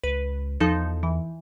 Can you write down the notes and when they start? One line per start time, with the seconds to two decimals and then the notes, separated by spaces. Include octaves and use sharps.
0.04 C#2 B4
0.60 E2 F3 D#4 A4
1.03 E3